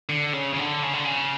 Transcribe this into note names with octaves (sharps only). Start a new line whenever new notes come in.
D3
C#3
C#3
D3
C#3
D3
C#3